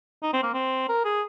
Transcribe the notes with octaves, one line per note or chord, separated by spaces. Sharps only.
D#4
C4
A#3
C4
A#4
G#4